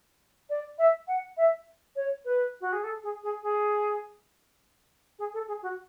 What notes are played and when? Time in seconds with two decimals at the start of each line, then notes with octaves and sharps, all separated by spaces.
0.50 D5
0.79 E5
1.08 F#5
1.37 E5
1.96 C#5
2.25 B4
2.61 F#4
2.73 G#4
2.84 A4
3.03 G#4
3.23 G#4
3.43 G#4
5.19 G#4
5.34 A4
5.48 G#4
5.62 F#4